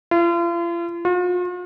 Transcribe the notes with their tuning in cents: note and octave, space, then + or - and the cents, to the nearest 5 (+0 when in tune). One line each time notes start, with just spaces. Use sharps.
F4 -40
F4 +45